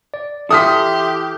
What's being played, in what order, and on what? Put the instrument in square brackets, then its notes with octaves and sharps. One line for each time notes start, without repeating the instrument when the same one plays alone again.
[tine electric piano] D5
[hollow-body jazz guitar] E3 A4 [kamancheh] G4 [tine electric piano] E5 C6 [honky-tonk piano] D#6 F6 B6